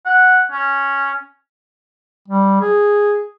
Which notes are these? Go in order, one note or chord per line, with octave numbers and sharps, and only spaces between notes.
F#5
C#4
G3
G#4